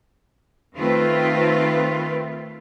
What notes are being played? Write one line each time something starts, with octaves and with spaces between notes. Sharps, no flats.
D#3 A3 C4 F4 B4